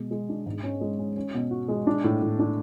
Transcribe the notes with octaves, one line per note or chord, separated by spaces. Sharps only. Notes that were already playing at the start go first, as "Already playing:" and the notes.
Already playing: B2 G#3
G#3
D4
G#2
C#4
G#3
C#4
C#4
B2
F#4
G#3
D4
A2
A2
D4